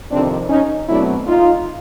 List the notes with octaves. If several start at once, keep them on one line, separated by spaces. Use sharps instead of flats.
F2 C3 D#3 C4 D4
C#4 D#4
B2 F#3 A3 C4 D4 E4
D#4 F4